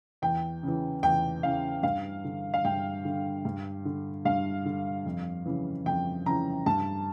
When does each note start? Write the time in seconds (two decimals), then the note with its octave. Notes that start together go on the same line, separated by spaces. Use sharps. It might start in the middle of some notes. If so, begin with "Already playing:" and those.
0.22 E2 G5
0.63 C#3 E3
1.03 E2 G5
1.43 C#3 E3 F5
1.83 G2 F5
2.24 D3
2.54 F5
2.65 G2 G5
3.05 D3
3.45 G2
3.85 D3
4.25 G2 F5
4.65 D3
5.06 F2
5.45 C#3 E3
5.86 F2 G5
6.26 C#3 E3 A#5
6.66 G2 A5